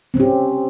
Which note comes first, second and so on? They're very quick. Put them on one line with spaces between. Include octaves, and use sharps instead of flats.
C4 C#4 G4